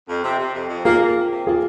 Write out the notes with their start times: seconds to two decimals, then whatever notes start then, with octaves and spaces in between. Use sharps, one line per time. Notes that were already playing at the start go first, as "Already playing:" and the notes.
0.09 F2
0.23 C3
0.39 C3
0.54 F2
0.69 F2
0.85 A#3 F4 G#4
1.01 A#3
1.17 C3
1.32 C3
1.47 A#3 F4 G#4